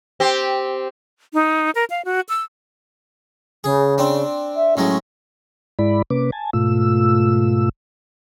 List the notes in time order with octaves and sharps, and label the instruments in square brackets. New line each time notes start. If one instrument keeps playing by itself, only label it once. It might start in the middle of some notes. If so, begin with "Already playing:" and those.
[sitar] C4 G4
[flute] D#4
A#4
F5
F#4
E6
[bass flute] C#3 [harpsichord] G#4
[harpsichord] C4 D4
[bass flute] E5
[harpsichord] A2 F#3 G#3 [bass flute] C#4
[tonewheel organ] G#2 G#3 E4 D5 B5
C3 A#3 C#4 B4 D6
G#5 A5
G#2 B2 A3 F4 E6